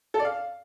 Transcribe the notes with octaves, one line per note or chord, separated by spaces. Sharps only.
A4
D5
F5